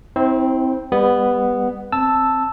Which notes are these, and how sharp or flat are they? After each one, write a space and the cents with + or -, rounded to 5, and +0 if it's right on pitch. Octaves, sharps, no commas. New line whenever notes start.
C4 -5 E4 -30 C5 +30
G3 +35 B3 +0
C4 +0 A5 +0 E6 +0